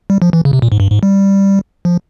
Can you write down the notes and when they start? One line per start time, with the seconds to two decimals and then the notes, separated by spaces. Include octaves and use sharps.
0.10 G3
0.22 F3
0.33 E3
0.45 C#3
0.53 C3
0.62 A#2
0.72 G#2
0.80 G2
0.91 G#2
1.03 G3
1.85 F3